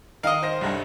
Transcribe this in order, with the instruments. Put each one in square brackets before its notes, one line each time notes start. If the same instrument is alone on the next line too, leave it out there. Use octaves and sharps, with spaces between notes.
[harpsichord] D#3 [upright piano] D#4 [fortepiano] D#5 F5
[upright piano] C5 A#6
[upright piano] C2 G2 [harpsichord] G3 A3 C#4